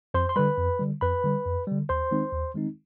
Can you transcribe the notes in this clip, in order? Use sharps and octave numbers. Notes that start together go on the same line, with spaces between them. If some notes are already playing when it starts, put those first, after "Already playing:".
F2 C5 C6
C6
D3 G3 B4 B5
F2
D3 G3
F2 B4 B5
D3 G3
F2
D3 G3
D#2 C5 C6
D#3 G#3 C4 D#4
D#2
D#3 G#3 C4 D#4